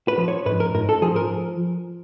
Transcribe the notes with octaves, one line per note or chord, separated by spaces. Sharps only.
B4
F3
C#5
G#2 B4
A#4
G#2 A#4
A4
F3 G#4
A#4